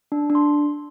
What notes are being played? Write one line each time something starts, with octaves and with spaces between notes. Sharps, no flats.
D4
D4
C6